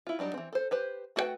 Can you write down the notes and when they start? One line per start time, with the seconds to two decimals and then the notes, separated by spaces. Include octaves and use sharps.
0.07 E4 F4
0.19 F#3 G3 D4 D#4
0.34 E3 C4
0.53 A4 C5
0.71 G4 B4 C5
1.16 A3 F#4 A4 B4 G5